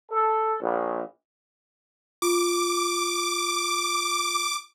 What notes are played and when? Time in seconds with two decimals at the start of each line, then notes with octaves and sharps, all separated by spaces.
0.12 A4
0.61 A#1
2.22 F4 D6